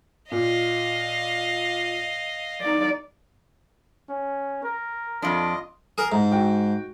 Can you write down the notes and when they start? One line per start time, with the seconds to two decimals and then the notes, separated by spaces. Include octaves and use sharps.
0.32 A#2 D#5 F5
2.61 D#4 D5
4.10 C#4
4.63 A#4
5.22 F2 D4 F4 D#5
5.98 G#4 A#4
6.12 G#2 A#5
6.32 F#4 G5